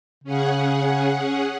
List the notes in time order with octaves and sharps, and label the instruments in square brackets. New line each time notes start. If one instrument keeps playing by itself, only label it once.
[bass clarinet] C#3 [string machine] C#4 G#4 F#5